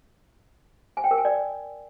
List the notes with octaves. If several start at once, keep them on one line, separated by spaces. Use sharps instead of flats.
G#5
G5
A#4
G#5
D5